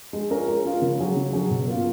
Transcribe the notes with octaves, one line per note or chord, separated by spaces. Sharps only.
G#3
C#4 F4 A#4
G#3
C#4 F4 A#4
C#3
F#3 C#4 G#4
C#3
F#3 C#4 G#4
B2
A#3 F4 A#4